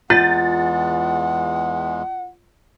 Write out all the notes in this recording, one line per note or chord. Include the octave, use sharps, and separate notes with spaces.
E2 E3 G#3 F4 F#5 A6